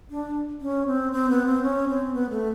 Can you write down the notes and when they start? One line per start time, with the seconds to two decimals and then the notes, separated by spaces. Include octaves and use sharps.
0.11 D4
0.61 C#4
0.87 C4
1.12 C4
1.29 B3
1.46 C4
1.63 C#4
1.88 C4
2.14 B3
2.30 A3